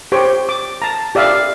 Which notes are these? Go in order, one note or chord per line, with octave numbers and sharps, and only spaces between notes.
G4 C5 C#5 G5
D6
A5 A#5
G4 D5 E5 F5